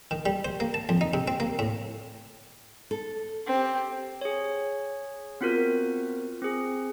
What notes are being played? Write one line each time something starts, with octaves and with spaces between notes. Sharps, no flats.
D#3
G3
C5
A#3
A5
F2
D#4
C3
C4
A#3
A2
A4
C4 G4
G#4 C#5
B3 C4 F4 F#4 A#4
C4 G#4